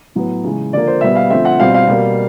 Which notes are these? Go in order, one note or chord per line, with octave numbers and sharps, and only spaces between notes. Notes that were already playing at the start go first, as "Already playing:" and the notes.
A2 F#3 B3
C#3 E3 G#3
D3 F3 A#3 D5
C5
B2 G3 B3 E5
F5
D3 F3 A3 C4 E5
F#5
B2 G3 C4 F5
F5
B2 G3 A#3